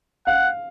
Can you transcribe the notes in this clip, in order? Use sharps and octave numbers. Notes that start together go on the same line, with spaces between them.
F5 F#5